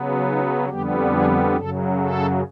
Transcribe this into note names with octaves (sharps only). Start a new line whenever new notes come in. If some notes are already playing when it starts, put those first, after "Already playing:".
Already playing: C#3 F#3 B3
D#4
F2 D3 G3 B3 G4
G#4
F#2 C#3 F#3 A4
A4